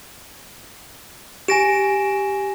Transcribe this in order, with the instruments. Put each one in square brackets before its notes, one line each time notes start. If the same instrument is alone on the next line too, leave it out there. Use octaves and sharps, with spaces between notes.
[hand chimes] G4 D7 [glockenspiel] G#5 A#6 E7